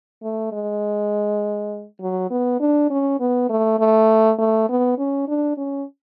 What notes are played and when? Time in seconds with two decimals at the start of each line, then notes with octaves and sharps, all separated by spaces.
0.22 A3
0.52 G#3
2.01 F#3
2.30 B3
2.60 D4
2.90 C#4
3.20 B3
3.49 A3
3.79 A3
4.38 A3
4.69 B3
4.98 C#4
5.27 D4
5.57 C#4